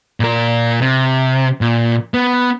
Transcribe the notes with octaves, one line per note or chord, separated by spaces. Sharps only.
A#2 A#4
C3
A#2
B3